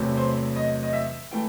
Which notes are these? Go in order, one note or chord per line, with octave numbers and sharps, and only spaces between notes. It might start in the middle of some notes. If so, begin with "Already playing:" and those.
Already playing: E2 C3 F#3 A3
C5
D#5
D#5
E5
E3 A3 G5